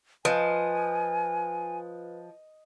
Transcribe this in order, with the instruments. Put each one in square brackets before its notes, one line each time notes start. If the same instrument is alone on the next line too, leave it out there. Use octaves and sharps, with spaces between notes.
[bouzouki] F3 [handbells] B4 [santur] D#5 [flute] G#5